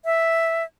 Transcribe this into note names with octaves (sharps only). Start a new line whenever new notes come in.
E5